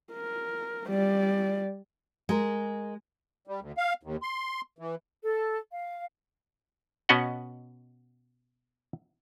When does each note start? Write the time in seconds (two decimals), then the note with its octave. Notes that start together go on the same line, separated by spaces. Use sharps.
0.13 A#4
0.88 G3 D5
2.29 G#3 A#4
3.47 G3
3.61 D2
3.77 F5
4.03 D#2
4.22 C6
4.79 E3
5.23 A4
5.72 F5
7.09 B2 B3 C#4 F#4 D#5 F#5